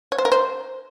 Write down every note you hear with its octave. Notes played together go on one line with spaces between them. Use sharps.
C#5
C5
A#4
C5